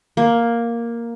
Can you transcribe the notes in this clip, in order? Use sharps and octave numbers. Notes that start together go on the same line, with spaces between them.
A#3